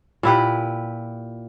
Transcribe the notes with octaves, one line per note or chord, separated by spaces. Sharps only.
A#2 E4 G4 B4